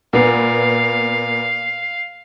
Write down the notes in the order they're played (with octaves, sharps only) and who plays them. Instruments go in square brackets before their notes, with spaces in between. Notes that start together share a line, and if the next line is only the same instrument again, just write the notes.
[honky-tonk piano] A#2 B3 [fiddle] F5